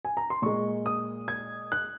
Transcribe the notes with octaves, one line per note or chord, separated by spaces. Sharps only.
G#5
A#5
C6
A#2 G#3 C#6
D#6
G#6
F#6